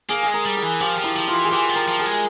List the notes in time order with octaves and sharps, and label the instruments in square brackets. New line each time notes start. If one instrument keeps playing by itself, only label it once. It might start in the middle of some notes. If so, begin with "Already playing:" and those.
[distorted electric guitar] A#3 [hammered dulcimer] G#4
[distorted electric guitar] G#3 [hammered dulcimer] G#4
[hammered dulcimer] A#4
[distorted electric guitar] G3
[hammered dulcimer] G#4
[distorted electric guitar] E3
[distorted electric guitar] F3 [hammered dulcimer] G4
[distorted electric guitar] F3
[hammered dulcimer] E4
[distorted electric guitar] F3
[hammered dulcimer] F4
[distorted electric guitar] E3
[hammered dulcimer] G#4
[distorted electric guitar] E3 [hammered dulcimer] G4
[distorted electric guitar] F3
[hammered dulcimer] A#4
[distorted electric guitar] F3
[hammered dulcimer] G#4
[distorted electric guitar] G#3